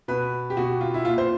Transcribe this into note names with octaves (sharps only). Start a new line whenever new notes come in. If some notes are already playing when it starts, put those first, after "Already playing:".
B2 B4
G4
B2 F#4
F4
E4
A#2 F4
C5